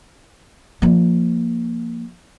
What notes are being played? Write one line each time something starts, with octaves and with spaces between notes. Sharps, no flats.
F3 A#3